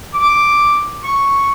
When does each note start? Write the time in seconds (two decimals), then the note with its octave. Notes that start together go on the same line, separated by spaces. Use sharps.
0.15 D6
1.04 C#6